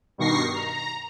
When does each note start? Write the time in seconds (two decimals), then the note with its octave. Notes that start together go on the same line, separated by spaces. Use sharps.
0.18 G2 B2 D#3 C#6 A#6 C7
0.54 A#5